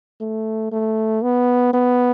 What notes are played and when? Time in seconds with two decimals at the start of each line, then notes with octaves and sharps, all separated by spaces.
0.21 A3
0.72 A3
1.23 B3
1.74 B3